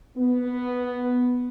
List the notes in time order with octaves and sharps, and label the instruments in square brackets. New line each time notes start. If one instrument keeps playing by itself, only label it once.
[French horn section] B3